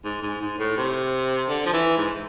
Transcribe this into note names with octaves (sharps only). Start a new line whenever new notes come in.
G#2
G#2
G#2
A2
C3
D3
F3
E3
G#2